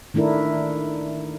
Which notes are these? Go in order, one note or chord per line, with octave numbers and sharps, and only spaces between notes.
D#3 A3 D4 E4 A#4